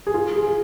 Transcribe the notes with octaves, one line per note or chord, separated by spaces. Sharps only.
G#4
F4
G#4